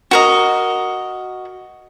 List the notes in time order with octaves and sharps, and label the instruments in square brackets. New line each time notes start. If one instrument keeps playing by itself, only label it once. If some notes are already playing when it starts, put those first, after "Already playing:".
[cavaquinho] F#4 A#4 D#5